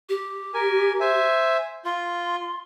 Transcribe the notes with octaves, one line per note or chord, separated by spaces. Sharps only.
G4
A#4 G#5
C5 E5 G#5
F4 C6